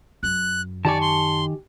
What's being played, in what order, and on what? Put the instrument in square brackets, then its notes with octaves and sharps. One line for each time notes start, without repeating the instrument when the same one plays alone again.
[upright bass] F#2 [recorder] F#6
[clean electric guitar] D#3 G4 G#5 [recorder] D5 [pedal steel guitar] A5 C#6
[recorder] C6